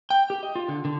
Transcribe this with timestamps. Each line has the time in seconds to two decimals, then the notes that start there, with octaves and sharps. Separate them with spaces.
0.10 G5
0.30 G4
0.43 D#5
0.55 F4
0.69 D3
0.85 D3